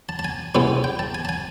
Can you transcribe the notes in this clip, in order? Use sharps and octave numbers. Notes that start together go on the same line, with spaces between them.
A5
A5
G#5
C2 B2 G#3 C4 E4
G5
A5
G#5
A5
G#5